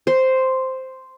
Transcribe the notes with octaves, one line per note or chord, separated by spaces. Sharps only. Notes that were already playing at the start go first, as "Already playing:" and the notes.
C5